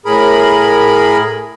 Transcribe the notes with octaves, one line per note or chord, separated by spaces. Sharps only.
A2 G#4 A#4 B5